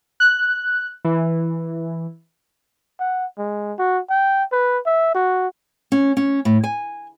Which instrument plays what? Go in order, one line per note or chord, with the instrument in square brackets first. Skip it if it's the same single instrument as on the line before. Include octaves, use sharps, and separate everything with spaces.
[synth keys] F#6
E3
[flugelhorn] F#5
G#3
F#4
G5
B4
E5
F#4
[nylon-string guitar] C#4
C#4
A2
G#5